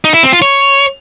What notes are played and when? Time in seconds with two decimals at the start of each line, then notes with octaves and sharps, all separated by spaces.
0.04 D#4
0.14 E4
0.23 C4
0.33 F4
0.42 C#5